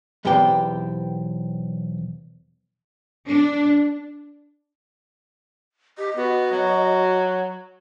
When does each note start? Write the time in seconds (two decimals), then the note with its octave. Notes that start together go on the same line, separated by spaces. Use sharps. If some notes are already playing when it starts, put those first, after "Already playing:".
0.25 B1 E2 B3 C4 G4 G5
3.27 D4
5.98 G4 D#5
6.17 B3 F#4
6.51 F#3